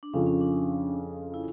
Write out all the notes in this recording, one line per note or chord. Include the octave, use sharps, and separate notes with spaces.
D4
F2 C#3 F3 C#4
C#4
D4
E4